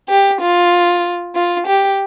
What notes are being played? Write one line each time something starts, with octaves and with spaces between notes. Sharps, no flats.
G4
F4
F4
G4